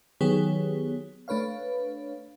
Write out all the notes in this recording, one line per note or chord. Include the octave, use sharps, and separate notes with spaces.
D#3 F#3 B3 G4 G#4 C#5
A3 D4 B4 C#5 F5